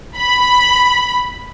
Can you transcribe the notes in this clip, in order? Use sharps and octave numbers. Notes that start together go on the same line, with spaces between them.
B5